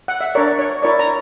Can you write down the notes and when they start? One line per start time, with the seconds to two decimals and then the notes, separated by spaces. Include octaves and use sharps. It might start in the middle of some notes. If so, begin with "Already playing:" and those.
0.08 F#5
0.21 E5
0.35 D4 A#4 C#5 D5
0.59 C#5
0.82 E4 A#4 C#5 D5
0.99 A#5